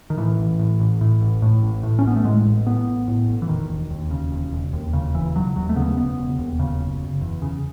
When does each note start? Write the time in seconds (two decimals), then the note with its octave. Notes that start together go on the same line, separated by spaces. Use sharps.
0.10 D#3
0.17 A2 E3
0.38 A1
0.59 A2
0.80 A1
1.01 A2
1.21 A1
1.42 A2
1.63 A1
1.83 A2
1.99 C#4
2.04 A1 B3
2.16 A3
2.24 A2 G#3
2.45 A1
2.66 A2 B3
2.86 A1
3.08 A2
3.28 A1
3.42 E3
3.49 E1 D#3
3.69 E1
3.90 D#2
4.11 C#3
4.32 E1
4.52 E1
4.73 D#2
4.93 C#3
5.14 E1 E3
5.35 E1 F#3
5.56 D#2 F#3
5.69 A3
5.76 C#3 B3
5.97 E1 B3
6.18 E1
6.39 D#2
6.59 C#3
6.80 F#1
7.01 F#1
7.21 E2
7.42 C#3